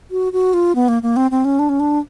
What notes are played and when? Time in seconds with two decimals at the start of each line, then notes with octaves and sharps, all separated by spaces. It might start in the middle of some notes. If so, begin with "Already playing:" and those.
0.11 F#4
0.33 F#4
0.54 F4
0.75 B3
0.88 A#3
1.03 A#3
1.16 C4
1.31 C4
1.45 C#4
1.59 D4
1.69 C#4
1.80 D4